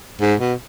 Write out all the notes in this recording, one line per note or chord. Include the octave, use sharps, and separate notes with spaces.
G#2
B2